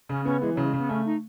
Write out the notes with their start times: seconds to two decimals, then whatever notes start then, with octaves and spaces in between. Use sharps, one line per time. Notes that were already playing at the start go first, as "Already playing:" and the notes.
0.09 C#3 C#4
0.25 B3 C#4
0.41 E3 G#3
0.54 F#3
0.57 C#3
0.66 G#3
0.73 C#3 B3
0.89 A3 C#4
1.05 D#4